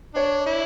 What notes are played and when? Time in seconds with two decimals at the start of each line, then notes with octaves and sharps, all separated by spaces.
0.15 D4 C#5
0.46 E4